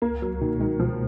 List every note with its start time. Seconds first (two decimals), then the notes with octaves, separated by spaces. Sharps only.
0.02 C#2 A#3
0.22 C#2 F#3
0.41 B2 D#3
0.60 D#3 G#3
0.79 B2 F3